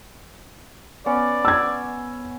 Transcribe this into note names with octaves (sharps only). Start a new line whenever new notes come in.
B3 C#4 D5 F#5
E6 G#6